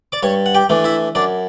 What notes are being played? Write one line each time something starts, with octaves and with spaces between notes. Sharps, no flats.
D5 D6
G2 C#5 C#6
F#5
G4 G5
E3 A3 D4
E4 E5
F#2 D4 D5